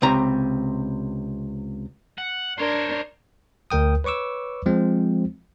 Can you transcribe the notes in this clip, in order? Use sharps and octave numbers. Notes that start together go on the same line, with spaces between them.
C#2 C3 A#5
F#5
D4 A#4 C5 C#5
D2 A#4 G5 D#6
B4 C#5 C#6 D6 E6
F3 G#3 C4